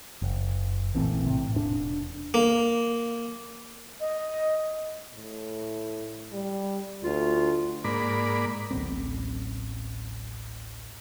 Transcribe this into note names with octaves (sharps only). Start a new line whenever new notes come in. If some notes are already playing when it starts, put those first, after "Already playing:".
F#1
A#1 A2 E3 C4
A2 C3
E1 D4
A#3
D#5
A2
G3
D2 F4
G#2 A#3 D5 B5
D1 A1 B3 C4